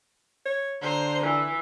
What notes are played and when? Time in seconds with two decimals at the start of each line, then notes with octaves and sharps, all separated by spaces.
0.45 C#5
0.82 D3 C5 A#5
1.23 E3